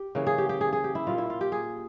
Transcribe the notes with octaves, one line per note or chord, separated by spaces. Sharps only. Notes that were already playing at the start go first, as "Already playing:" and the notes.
Already playing: G4
C#3 E3 A#3 C#4
G#4
G4
G4
G#4
G#4
G4
E4
A#2 G3 A#3 F4
E4
F4
G4
G#4